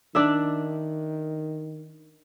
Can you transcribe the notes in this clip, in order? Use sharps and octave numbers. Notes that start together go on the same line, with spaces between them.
D#3 D4 D5 E5